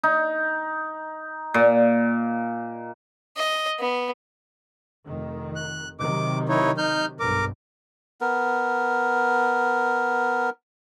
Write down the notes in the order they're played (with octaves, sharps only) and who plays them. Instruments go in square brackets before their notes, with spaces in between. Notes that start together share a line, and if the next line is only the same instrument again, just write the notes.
[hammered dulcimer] D#4
A#2
[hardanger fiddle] D#5
B3
[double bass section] F1 D#3
[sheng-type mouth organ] F#6
[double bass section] C3 D#3 F#3 [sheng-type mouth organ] D6
[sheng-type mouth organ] D#4 E4 C#5
D#4 F6 G6
[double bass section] B1 G2 [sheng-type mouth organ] A#4 D6
[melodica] B3 A#4